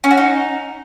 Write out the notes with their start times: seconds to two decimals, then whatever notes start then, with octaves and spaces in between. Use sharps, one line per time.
0.04 C#4
0.11 F#4
0.18 D#4